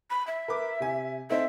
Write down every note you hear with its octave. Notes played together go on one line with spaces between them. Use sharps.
B5
E5
A#4 B4 D6
C3 G#5
C4 D#4 A4 E5